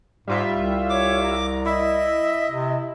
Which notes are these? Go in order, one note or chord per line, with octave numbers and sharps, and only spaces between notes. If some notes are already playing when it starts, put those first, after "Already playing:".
G#2 G3 F4 E5
C2
C#5 D6
A#5
E4 D#5 E5
C3